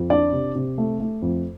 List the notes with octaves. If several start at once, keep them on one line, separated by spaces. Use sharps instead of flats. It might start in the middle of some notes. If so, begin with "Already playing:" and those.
Already playing: F2
D4 D5
C3
C3
A3
A3
F2